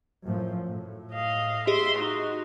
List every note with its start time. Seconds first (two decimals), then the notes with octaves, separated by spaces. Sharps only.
0.24 F#2 A2 F3
0.66 A2
1.14 D#5 F5
1.67 G4 G#4 D#5 E5 C6
1.98 D#4 F#4